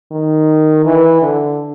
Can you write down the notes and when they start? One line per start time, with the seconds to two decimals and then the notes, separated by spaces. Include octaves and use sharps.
0.11 D#3
0.86 E3
1.22 D3